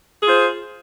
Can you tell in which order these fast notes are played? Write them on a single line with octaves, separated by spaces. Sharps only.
G#4 F4 C5